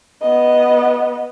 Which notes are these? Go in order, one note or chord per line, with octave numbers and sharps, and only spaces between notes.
B3 D#5